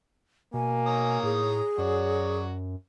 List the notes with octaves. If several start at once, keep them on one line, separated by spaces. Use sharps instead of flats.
B2 A#3 G#5
C#5 A#5 D#6
A2 G#4
F#2 F#3 F#4 C#5 D5